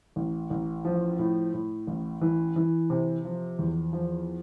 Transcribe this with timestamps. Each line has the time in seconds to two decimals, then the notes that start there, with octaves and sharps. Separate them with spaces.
0.16 A1
0.50 A1
0.85 F3
1.19 A2
1.54 A2
1.87 A1
2.21 E3
2.56 E3
2.90 C3
3.25 F3
3.59 E2
3.93 F3